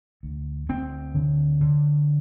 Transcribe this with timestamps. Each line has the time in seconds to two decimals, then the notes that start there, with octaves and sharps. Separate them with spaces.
0.23 D2
0.69 D2 C4
1.14 D3
1.61 D3